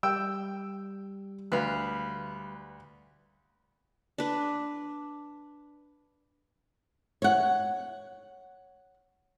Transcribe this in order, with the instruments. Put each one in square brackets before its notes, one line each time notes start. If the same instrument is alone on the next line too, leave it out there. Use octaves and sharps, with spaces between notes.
[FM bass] G3 [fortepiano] G5 E6
[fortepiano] D2 [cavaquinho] B4 F5
[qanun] D4 B4
[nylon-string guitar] C#5 F#5